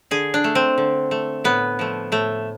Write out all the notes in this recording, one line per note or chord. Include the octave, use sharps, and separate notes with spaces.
D3 G#4
D4
A3
C4
D3
A3
A2 B3
F3 A3
A2 A3